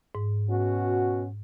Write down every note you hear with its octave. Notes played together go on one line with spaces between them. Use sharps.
G#2
B2 C#4 F#4